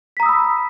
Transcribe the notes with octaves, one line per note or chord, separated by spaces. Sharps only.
A#5 B5 D#6 E6 B6